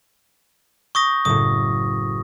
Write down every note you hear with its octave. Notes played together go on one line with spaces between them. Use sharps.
C#6 D#6 G6 A#6
F#1 A2 D#6